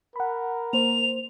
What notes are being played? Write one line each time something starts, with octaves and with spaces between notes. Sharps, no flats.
A#4 F#5 B5
A#3 C5 F7